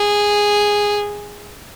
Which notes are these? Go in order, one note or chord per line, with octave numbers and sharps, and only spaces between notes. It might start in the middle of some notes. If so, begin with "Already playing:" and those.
Already playing: G#4